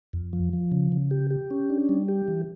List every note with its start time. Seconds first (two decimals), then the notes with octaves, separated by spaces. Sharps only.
0.13 F2
0.33 F3
0.53 F3
0.72 C#3
0.92 C#3
1.11 G4
1.31 G4
1.51 C#4
1.70 D4
1.89 G3
2.09 G4
2.28 E3